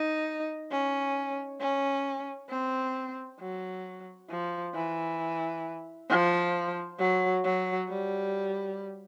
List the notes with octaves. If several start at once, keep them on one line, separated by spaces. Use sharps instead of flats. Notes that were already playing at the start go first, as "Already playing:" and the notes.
Already playing: D#4
C#4
C#4
C4
F#3
F3
E3
F3
F#3
F#3
G3